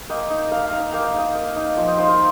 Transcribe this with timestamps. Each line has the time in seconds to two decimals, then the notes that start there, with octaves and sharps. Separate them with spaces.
0.10 A#3 D#5 G5
0.30 D#4
0.51 A#3 F5 A#5
0.65 F5 A#5
0.72 D#4
0.80 A#5
0.93 A#3 G5
1.05 F5
1.14 D#4 D#5 G5
1.35 A#3
1.56 D#4
1.77 F3 D#5 G5
1.88 D#5 G5
1.98 D#4 C5 F5
2.08 A#4 D#5